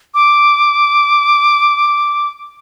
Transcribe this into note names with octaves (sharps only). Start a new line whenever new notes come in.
D6